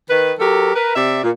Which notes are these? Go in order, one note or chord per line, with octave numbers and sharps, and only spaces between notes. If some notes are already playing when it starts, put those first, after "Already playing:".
D#3 B4
F#3 G4 A4 A#4
A#4 B4
C3 D5 E5
A#2